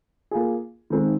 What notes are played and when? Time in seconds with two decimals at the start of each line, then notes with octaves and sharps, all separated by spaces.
0.31 A#3 F4 G#4
0.90 D#3 G#3 C4 D#4